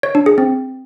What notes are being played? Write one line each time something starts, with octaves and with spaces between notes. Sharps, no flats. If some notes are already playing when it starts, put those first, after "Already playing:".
C#5
D4
G#4
C4